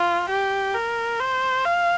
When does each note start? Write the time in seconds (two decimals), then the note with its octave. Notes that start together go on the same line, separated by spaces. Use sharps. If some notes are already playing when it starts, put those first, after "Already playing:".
Already playing: F4
0.29 G4
0.75 A#4
1.20 C5
1.65 F5